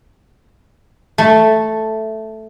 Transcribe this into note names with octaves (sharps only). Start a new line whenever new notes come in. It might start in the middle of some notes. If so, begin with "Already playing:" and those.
A3